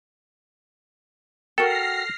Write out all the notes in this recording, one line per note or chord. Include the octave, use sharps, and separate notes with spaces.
F#4 A4 A#4 G5 F6 A#6 C7